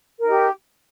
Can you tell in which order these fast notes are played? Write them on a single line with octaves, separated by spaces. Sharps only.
A#4 D#4 G4